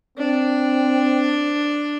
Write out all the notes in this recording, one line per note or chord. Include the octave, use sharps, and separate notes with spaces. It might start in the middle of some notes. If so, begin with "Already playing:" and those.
C4 D4